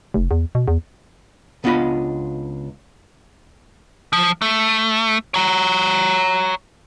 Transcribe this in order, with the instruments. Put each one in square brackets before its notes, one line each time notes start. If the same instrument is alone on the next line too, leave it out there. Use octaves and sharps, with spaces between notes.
[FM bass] F1
E2
B2
E2
[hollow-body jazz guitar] C#2 B3 D4 F4 D#5 B5
[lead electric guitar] F3
A3
C#5 A#5